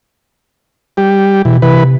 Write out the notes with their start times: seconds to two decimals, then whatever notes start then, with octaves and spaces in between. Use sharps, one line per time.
0.97 G3 G4
1.45 B2 E3
1.62 C3 E3 B4